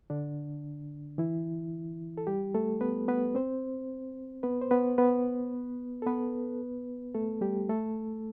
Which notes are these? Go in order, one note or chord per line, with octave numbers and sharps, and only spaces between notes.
D3 D4
E3 E4
A4
G3 G4
A3 A4
B3 B4
B3 B4
C4 C5
B3 B4
C5
B3 B4
B3 B4
A4
B3 B4
A3 A4
G3 G4
A3 A4